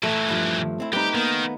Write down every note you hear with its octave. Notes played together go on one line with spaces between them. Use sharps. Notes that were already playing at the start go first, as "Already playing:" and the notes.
A#2 E3 A3 E5
G2 F3
C4 E4
G3 C4 D#4 G4 B4
D#3 A#3 B3